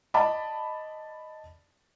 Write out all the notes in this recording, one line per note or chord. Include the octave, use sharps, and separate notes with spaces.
D5 D#5 A5 B5 D6